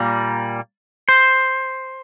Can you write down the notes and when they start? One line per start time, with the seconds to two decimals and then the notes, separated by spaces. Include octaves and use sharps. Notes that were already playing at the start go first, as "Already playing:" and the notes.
Already playing: A#2 G3 A#3
1.09 C5